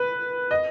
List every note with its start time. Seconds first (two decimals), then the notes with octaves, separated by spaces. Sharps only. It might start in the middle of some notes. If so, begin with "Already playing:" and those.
Already playing: B4
0.51 D#5